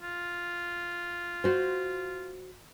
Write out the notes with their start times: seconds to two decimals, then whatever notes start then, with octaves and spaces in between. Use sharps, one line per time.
0.02 F4
1.44 F#4 C5